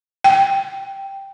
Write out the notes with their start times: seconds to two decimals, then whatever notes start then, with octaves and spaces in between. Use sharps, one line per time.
0.24 G5